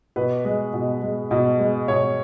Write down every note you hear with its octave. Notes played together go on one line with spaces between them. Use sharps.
B2 B4
G#3
B2
G#3
B2
G#3
B2 C#5